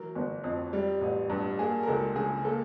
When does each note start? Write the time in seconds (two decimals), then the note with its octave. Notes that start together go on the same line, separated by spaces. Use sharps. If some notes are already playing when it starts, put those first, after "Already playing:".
Already playing: E3 F#3 A#4
0.15 G1
0.44 F2
0.73 G3
1.01 A1
1.30 G2
1.59 A#3 G#4
1.83 A#4
1.87 C#2 A4
2.15 C#3 G#4
2.44 A#3 A4